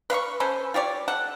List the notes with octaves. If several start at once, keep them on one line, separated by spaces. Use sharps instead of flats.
B4 F5 B5 C#6
C#4 A4 B4 C5
F4 G4 C#5 D5
A4 F#5